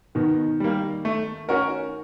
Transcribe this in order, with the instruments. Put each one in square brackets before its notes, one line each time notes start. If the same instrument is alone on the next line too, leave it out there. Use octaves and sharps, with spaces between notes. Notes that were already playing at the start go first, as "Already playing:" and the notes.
[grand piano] B2 [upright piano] D#3
[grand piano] G3 A#3
A3
C#4 F#4 A#4